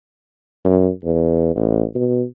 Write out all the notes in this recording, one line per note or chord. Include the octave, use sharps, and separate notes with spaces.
F#2
E2
A1
B2